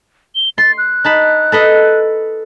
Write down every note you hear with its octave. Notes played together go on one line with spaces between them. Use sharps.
G7
C6 A6
F#6
D#4 A5 B5
A4 B4 D#5